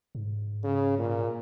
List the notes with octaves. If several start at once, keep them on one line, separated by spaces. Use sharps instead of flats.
G#2
C#3
A#2